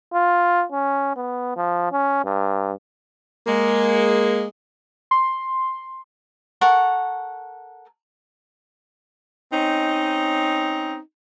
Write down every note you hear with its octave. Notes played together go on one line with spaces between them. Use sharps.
F4
C#4
B3
F3
C#4
G2
G#3 A#3
C6
A4 A#4 F#5 C#6
C4 C#4 D#4